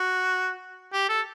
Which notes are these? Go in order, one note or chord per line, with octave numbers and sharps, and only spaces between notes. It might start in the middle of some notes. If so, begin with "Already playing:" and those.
Already playing: F#4
G4
A4